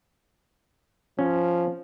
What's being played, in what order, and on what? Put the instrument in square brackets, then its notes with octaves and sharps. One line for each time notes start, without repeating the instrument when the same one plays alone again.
[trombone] F3 [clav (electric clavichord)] C#4